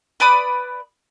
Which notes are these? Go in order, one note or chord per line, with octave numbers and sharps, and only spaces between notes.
B4 D5 B5 D#6